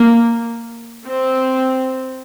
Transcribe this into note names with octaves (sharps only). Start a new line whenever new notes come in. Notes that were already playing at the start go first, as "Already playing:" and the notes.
Already playing: A#3
C4